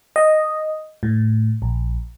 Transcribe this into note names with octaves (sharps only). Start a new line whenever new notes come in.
D#5
A2
A#1